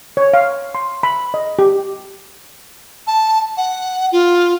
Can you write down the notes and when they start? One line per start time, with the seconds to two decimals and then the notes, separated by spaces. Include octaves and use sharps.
0.17 C#5
0.34 F5
0.75 C6
1.03 B5
1.34 D#5
1.59 G4
3.07 A5
3.57 F#5
4.12 F4